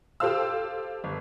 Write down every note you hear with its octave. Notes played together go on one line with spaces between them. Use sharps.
G4 A4 C5 F5 E6
G1